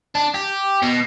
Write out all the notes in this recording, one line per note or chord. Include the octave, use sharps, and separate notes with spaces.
D4
G4
B2